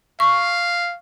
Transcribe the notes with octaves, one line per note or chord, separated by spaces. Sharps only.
F5 C#6